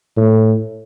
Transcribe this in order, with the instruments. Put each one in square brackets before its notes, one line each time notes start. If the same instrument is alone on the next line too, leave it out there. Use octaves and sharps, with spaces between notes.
[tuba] A2